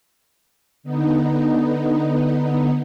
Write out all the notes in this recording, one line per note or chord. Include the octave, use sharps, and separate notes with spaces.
D3 B3 D#4